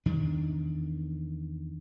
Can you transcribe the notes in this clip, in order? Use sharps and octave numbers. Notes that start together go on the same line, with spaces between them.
E2 D#3 D4